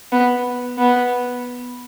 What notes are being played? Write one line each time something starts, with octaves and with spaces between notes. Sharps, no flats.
B3
B3